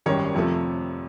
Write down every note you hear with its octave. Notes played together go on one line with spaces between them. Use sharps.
G#1 F#2 D#3 G3 C#5
F2 C3 F3 A3